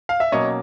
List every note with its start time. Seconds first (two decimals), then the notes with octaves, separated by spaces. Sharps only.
0.09 F5
0.20 E5
0.32 B2 F#3 A#3 C#4 C#5 D#5